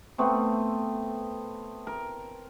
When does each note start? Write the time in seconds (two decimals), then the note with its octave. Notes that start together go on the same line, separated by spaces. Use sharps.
0.18 A3 B3 C4
1.87 A#4